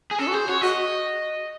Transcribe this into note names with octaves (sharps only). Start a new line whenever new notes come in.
G#4
C#4 A4
F#4
G#4 C5
F#4 C#5
F#4 D#5